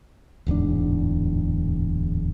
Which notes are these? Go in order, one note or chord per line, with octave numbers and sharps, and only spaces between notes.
D1 E2 G#2 D4